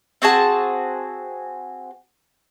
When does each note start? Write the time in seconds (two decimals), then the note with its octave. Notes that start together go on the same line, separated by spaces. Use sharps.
0.22 C4 F#4 G#4 A5